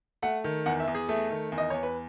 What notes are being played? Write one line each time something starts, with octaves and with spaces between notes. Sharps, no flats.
A3 F#5
D#3
E2 F#5
E5
E2
G#4
A3
D#3
E2
D#5
E2 C#5
B4